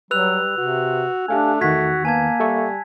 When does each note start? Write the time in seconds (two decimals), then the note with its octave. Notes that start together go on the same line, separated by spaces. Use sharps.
0.11 F#3 G3 B4 E6 F#6 F7
0.58 C3 F#4
1.28 A3 D4 G4 F5 G#5
1.61 E2 D#3 F#4 G#6 B6
2.05 A#3 B3 G#5 A5 G#6
2.40 G3 A4 E5 C#6